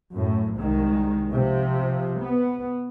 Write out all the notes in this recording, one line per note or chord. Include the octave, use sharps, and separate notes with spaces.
F#2 A2
C2 D#3 G#3
C3 F3
B3